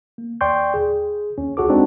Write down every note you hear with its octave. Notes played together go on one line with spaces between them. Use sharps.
A#3
D#2 D5 G5 C6 C#6 G6
G#4
D#2 C#4
C#2 F#4 G#4 A4 D6
G#3 C4 D4 D#4 F#4 A4